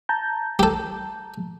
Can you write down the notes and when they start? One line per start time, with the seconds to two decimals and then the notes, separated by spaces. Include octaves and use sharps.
0.09 A5 A#5 G6
0.59 G4 A4